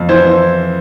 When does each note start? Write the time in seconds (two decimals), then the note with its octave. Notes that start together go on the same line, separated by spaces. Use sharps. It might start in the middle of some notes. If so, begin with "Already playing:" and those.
Already playing: F2
0.09 E3 C5
0.25 E3